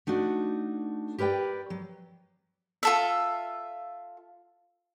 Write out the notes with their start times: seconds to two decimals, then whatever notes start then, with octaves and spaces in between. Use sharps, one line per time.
0.07 A3 D4 D#4 F#4
1.18 G4 A#4 B4 D5 G5
1.70 F#3
2.83 F4 A4 E5